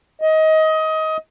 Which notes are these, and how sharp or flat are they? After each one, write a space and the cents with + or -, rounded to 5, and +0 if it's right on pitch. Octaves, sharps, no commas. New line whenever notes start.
D#5 +20